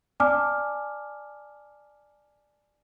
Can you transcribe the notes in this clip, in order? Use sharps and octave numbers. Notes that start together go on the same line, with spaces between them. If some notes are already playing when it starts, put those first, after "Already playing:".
D5 G#5 A5 D6 F6